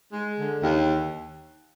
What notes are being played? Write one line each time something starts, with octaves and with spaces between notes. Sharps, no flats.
G#3
D3
D#2